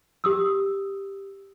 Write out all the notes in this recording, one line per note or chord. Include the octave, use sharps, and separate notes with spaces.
G4 D#6 E6